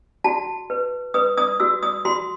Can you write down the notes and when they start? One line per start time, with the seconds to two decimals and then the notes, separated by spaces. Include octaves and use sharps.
0.24 F#4 A5
0.70 B4
1.14 B4 D#6
1.37 D#6
1.60 F#4 E6
1.83 D#6
2.05 F#4 C6